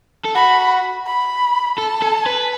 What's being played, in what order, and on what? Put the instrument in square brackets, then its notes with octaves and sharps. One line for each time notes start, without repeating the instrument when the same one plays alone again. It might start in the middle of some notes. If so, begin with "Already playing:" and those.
[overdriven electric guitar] A4
[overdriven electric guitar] F#4 [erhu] B5
[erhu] B5
[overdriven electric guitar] A4 [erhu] A5
[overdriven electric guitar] A4
B4